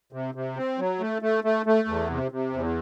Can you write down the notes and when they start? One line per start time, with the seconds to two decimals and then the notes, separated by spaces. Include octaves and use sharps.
0.12 C3
0.35 C3
0.57 C4
0.78 F#3
1.00 A3
1.22 A3
1.44 A3
1.66 A3
1.88 E2
2.10 C3
2.32 C3
2.53 E2